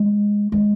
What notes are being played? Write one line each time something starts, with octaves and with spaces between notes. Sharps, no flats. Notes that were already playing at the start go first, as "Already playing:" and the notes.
Already playing: G#3
G#3